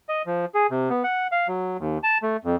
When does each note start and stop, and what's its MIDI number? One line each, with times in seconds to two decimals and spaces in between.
0.09 0.22 75
0.26 0.45 53
0.54 0.67 68
0.71 0.89 48
0.90 1.03 59
1.04 1.27 78
1.32 1.47 77
1.48 1.77 54
1.79 1.98 39
2.03 2.18 81
2.23 2.37 57
2.44 2.56 41